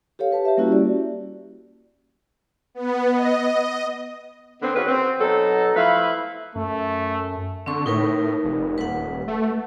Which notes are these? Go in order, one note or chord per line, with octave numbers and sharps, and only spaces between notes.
G4 A4 C#5 F5
G4 B4 A5
G4 E5
G3 A#3 C#4 E4 F#4 G4
D5
B3
D#5
D3 B3 C4
D#3 C#4 F#4 G#4 B4
C4
B2 F#3 D#4 A4
F3 A3 E4 B4 F5
F#2 A3
D3 C4 C#6
A2 D#4 A#4 B4
F1
D#1 B4 F#5
A3